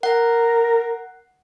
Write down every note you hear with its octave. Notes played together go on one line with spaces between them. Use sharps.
A#4 F#5